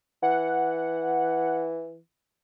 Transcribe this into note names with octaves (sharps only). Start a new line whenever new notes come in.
E3 F#5